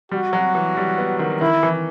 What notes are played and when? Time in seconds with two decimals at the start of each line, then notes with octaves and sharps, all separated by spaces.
0.11 G3 F#4
0.33 F#3
0.55 E3
0.77 G3
0.98 B3
1.19 D#3
1.41 D#3 E4
1.63 E3